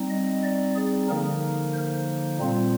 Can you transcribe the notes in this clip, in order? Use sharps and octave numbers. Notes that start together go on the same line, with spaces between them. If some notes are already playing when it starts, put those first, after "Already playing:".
Already playing: G3 C4 D#4
D#5
D5
G#4
D3 F3 A#3 D#4 A#4
C5
A#2 G3 C4 F4